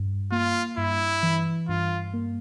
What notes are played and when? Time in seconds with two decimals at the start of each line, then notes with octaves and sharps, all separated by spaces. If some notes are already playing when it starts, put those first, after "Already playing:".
Already playing: G2
0.31 A#3 F4
0.77 G2 E4
1.23 E3
1.69 G2 F4
2.14 A#3